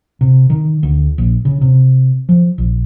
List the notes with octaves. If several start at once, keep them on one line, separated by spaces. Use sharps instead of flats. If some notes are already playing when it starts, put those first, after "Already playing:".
C3
D#3
D2
A#1
C#3
C3
F3
A#1